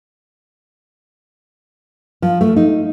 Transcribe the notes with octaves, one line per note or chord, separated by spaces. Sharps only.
F3
A3
D#4